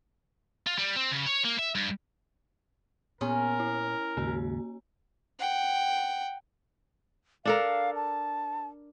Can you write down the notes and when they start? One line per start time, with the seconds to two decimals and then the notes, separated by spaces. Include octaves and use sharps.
0.66 F4
0.78 G3
0.96 C4
1.11 C#3
1.26 C#5
1.44 A#3
1.59 E5
1.75 G2
3.21 A#2 B3 C#4 A#4 C6 D#6
3.60 E4
4.17 D#2 G#2 C#3 A#3 F#4 A#5
5.39 F#5 G5
7.45 D4 A4 A#4 F5
7.95 A5